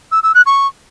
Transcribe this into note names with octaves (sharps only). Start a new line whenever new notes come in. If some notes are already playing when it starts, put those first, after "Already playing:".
E6
E6
F#6
C#6